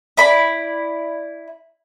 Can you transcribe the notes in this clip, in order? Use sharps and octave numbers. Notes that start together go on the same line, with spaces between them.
E4 D5 B5